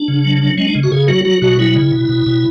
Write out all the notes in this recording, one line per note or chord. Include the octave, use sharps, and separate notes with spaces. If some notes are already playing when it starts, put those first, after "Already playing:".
Already playing: D4
C#3
F#3
F#3
G#3 C#4
D4
C#3
F#4
C#3 G#4
F#3 F#4
F#3 F#4
B2 F#4
F#3 E4
C#3
B2
B2
B2